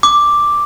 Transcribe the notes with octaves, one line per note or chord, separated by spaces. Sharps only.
D6